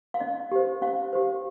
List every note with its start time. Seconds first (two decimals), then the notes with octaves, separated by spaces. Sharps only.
0.14 F5
0.20 C#4 D#5
0.52 G4 C5
0.82 C#4 F5
1.13 G4 C5